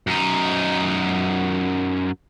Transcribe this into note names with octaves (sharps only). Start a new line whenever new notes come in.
F#2 D#4